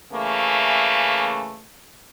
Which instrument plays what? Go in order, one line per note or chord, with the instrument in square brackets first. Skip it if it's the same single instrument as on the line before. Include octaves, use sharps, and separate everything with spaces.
[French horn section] C#3 E3 A3 A#3